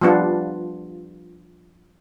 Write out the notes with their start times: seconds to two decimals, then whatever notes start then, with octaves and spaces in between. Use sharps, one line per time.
0.01 F3 G3 B3 D4 F4